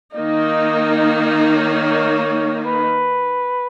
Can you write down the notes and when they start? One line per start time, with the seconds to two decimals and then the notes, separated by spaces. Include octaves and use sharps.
0.14 D#3 A#3 D#4 D#5
0.98 D#5
1.26 D#5
1.55 C#5
1.83 C#5
2.66 B4